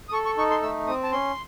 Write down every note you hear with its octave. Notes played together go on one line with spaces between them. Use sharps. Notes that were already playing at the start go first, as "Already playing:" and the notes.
D#6
A4 C#6
C#6
D#4 C#6
C6
A3 E6
C4 D#6
A5
C#4 C6